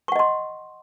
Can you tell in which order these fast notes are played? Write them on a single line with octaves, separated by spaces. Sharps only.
C#6 F#5 D#5 C6